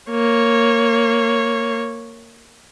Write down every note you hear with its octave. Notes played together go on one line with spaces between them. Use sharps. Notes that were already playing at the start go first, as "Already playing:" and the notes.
A#3 C#5